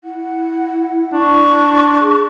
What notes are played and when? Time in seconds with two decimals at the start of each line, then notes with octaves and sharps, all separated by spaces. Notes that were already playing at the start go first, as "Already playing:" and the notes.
0.04 E4 F#5
1.13 D4 C#6
2.01 G#4